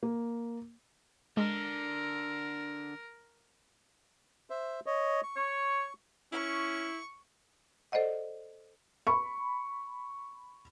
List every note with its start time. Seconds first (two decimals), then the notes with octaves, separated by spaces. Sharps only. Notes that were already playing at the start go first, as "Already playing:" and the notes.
0.03 A#3
1.37 D3 G#3 A#4
4.50 C5 E5
4.86 C#5 D#5
5.23 C#6
5.36 C#5
6.32 C#4 E4 C#6
7.92 A4 C5 D5 D#5 F#5
9.07 B5 C#6